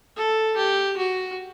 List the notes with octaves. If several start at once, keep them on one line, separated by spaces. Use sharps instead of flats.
A4
G4
F#4